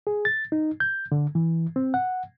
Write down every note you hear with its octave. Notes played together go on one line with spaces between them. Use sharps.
G#4
A6
D#4
G6
D3
E3
C4
F#5